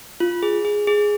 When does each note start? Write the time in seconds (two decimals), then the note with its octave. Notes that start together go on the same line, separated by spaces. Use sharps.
0.20 F4
0.43 G#4
0.65 G#4
0.87 G#4